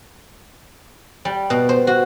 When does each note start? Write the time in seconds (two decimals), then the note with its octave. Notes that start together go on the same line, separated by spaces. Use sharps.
1.25 G3
1.50 B2
1.69 C5
1.87 F#4